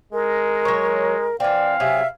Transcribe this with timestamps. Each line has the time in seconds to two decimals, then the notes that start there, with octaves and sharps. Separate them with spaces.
0.13 G#3 A#4
0.65 F#3 C#5
1.40 E3 C4 D5 F5
1.80 C3 F#3 G#4 E5